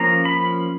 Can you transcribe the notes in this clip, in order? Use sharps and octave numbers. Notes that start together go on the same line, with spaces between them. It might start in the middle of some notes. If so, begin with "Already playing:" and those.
Already playing: F3 A#3 C#4 A#5
B5